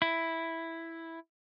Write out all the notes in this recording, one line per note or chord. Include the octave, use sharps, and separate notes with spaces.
E4